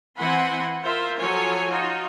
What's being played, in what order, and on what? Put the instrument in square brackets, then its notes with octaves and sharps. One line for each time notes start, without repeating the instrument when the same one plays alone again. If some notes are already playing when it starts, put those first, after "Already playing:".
[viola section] E3 C4 F#5 G#5 B5 C6
F4 A#4 C5 E5
F3 F#3 A4 C#5 G#5
D#4 F4 F#4